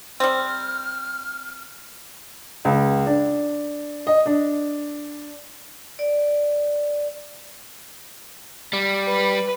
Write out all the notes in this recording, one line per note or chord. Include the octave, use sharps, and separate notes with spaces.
G3 C4 F6
C#2
D4
D#5
D4
D5
G3
B4